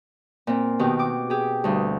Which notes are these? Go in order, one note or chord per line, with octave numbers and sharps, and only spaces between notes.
A#2 C4
B2 D#3 G4
D6
G4 G#4
D2 G2